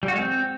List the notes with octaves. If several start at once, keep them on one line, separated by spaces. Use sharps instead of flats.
G3
F#4
G#3
C4